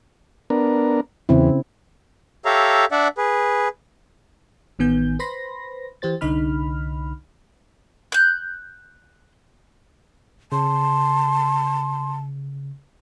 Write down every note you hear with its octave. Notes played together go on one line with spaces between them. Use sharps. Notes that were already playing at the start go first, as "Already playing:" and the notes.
B3 D4 A#4
E2 C#3 C4 E4
G4 A4 C#5 E5 F5 A#5
D4 D5 E5 F#5
G#4 B4
A1 D#3 B3 G#5 G6
B4 C5 B5 C6 A#6
E3 G4 C5 A6
C2 D3 D#4 B5 F6
F#6 G6
C#3 A5 C6